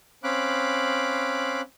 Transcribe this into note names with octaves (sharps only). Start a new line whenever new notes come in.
C4 C#4 F5 B5 D6 F#6